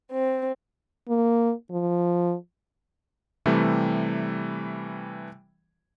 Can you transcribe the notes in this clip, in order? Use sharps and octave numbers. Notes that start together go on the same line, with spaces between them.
C4
A#3
F3
C3 E3 G3 A3